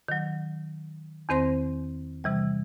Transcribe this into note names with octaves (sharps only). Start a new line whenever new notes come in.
D#3 F#3
E2 D#3 C4 C5 C6 A#6
C3 E3 G3